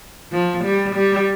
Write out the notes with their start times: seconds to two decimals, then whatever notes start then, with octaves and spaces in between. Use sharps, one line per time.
0.32 F3
0.64 G3
0.95 G3